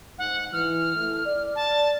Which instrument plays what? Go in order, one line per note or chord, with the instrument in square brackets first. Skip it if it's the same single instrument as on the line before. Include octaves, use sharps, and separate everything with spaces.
[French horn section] G#2 [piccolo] F#5
[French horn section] E3 [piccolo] F6
[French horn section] A3 E4
D5
[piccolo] A5